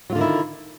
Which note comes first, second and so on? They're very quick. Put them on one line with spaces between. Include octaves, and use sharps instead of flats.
F#3 F4 D3 D#3 E4